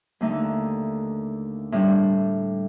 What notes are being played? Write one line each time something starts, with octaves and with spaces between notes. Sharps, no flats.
D#2 D3 A3 D#4
A2 G3 D4